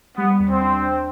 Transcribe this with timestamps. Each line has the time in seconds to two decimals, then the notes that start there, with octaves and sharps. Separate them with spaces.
0.17 G3 B3
0.39 D#2
0.49 C4
0.61 D4
0.83 D4